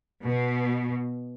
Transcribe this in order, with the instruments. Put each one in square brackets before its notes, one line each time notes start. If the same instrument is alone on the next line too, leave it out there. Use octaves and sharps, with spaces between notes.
[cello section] B2